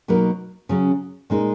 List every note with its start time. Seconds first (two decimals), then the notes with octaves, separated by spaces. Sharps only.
0.08 B2 F#3 A#3 D#4 A#4
0.69 C#3 F#3 C#4
1.30 A#2 G#3 D#4 A#4